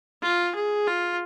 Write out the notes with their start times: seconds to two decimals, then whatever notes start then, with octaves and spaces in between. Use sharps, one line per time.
0.22 F4
0.55 G#4
0.87 F4